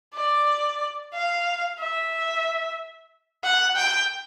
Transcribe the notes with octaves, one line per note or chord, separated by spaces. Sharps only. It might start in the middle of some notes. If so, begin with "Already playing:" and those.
D5
F5
E5
F#5
G5